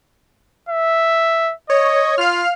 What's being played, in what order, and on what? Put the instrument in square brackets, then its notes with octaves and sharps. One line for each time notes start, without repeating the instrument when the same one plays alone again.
[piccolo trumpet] E5
[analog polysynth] C#5 [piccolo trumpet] D#5
[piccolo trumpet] F4 [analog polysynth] F5 F6